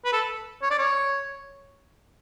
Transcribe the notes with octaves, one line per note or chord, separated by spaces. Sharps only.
B4
A4
C#5
D5
C#5